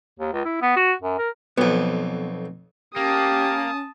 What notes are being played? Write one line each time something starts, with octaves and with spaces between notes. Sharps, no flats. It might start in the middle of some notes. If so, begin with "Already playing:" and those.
D#2
C#2
E4
B3
F#4
F#2
A#4
B1 F2 B3
A#3 C#4 G4 A5 D#6